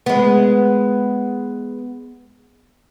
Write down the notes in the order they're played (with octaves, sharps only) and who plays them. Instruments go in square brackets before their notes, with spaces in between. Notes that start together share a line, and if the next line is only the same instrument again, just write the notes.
[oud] G#3 B3